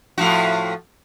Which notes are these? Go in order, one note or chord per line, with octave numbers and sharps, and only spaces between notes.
A2 F3 F#4